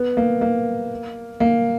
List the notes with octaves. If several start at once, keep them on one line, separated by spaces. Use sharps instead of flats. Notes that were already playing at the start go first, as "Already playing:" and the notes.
Already playing: B3
A#3
A#3
A#3